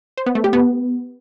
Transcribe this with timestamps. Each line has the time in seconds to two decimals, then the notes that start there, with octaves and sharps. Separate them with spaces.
0.18 C5
0.26 B3
0.35 A3
0.44 G4
0.53 B3